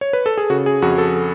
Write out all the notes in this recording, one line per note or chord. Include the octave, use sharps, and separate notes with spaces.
C#5
B4
A4
G#4
C#3 F#4
G#4
F2 F#4
A4